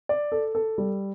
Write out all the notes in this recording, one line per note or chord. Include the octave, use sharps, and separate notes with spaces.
D5
A4
A4
G3